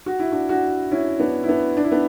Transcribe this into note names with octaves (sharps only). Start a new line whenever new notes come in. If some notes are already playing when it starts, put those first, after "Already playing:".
F#4
E4
D4 F#4
D4 F#4
C#4 E4
B3 D4
E4
B3 D4
D4
E4
B3 D4